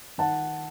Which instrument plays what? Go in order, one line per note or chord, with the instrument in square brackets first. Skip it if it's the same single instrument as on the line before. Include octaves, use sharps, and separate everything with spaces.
[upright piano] D#3 F#5 A5